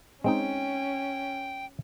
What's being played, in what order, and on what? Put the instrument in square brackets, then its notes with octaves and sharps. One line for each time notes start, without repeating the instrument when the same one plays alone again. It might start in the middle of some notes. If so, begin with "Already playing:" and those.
[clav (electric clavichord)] G#3 C4 D#4 [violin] C#4 [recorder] G5